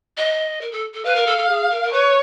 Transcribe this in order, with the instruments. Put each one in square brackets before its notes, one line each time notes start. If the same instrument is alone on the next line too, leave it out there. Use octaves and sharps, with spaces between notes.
[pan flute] D#5
A#4
A4
A4
[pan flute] B4 [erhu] F5
[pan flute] A#4
A4
A4
G#4
A#4
A#4
[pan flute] B4 [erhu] C#5